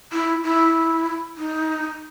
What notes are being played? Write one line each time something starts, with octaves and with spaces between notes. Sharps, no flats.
E4
E4
D#4